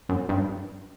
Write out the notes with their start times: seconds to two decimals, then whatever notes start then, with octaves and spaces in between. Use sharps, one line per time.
0.09 F#2
0.29 G2